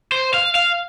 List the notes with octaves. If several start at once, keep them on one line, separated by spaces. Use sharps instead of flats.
C5
F5
F5